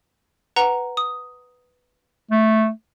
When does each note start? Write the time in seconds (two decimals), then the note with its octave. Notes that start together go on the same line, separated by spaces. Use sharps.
0.56 B4 F#5 A#5
0.97 D#6
2.31 A3